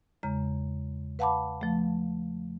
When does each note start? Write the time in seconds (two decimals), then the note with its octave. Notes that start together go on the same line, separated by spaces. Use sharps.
0.23 E2 C#3 G#3 A#5
1.19 B4 F5 F#5 A5 B5 D6
1.61 F3 A3